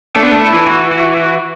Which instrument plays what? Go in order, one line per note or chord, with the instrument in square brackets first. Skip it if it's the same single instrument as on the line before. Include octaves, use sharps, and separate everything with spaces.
[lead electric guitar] A3 [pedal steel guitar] D4
[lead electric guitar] B3
A3
[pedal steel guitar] E4
[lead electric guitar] E3
[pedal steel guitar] F#4
F#4
F#4